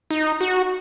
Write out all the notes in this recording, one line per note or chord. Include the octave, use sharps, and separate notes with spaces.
D#4
F#4